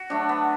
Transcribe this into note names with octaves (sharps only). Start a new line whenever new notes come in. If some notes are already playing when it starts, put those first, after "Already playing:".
Already playing: F#4
F#3 A3 D4
B3